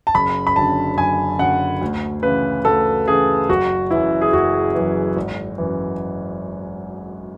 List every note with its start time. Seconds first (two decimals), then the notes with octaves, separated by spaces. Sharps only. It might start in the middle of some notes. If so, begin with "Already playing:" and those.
0.07 A5
0.14 F#1 B5
0.47 B5
0.56 F#2 D3 A5
0.98 F#1 G#5
1.39 F#2 D3 F#5
1.81 D2
2.23 C#3 E3 B4
2.65 D2 A4
3.07 C#3 E3 G#4
3.49 F#1 F#4
3.91 F#2 E3 E4
4.21 G#4
4.33 F#1 F#4
4.74 F#2 E3
5.17 G#1
5.58 F#2 E3